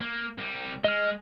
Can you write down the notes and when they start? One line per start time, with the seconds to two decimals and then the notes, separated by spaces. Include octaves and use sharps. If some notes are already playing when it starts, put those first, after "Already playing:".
0.01 A#3
0.38 C2 G3
0.84 G#3 D#5 F6